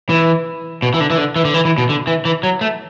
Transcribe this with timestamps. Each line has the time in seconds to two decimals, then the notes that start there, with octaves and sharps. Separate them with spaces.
0.09 E3
0.82 B2
0.94 E3
1.00 D3
1.10 E3
1.18 D3
1.36 E3
1.45 D3
1.54 E3
1.65 E3
1.78 B2
1.89 D3
2.07 E3
2.25 E3
2.43 F#3
2.61 A3